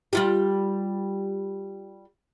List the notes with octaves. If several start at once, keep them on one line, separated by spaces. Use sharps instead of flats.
G3 F4 G4